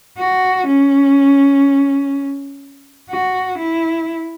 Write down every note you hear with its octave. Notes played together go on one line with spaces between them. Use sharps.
F#4
C#4
F#4
E4